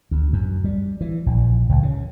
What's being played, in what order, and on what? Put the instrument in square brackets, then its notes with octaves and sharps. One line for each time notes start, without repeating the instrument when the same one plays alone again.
[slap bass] D2
F#2
G3
E3
A#1
C#2
C#3